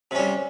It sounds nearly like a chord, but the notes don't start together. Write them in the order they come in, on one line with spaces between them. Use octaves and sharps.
C3 C#4 G3